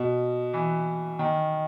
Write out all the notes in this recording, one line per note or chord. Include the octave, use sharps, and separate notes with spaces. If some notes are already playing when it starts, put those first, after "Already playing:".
Already playing: B2
E3
D#3